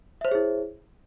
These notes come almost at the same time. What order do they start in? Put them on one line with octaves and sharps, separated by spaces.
E5 C5 C#5 G#4 E4